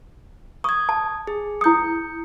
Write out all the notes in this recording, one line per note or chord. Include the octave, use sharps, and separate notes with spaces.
C#6 D#6 G#6
A5
G#4
E4 D#6 G6 C#7